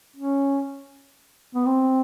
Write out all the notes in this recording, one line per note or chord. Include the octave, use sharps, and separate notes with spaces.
C#4
B3
C4